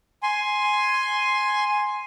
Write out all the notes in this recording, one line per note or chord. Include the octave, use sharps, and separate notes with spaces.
G#5 C6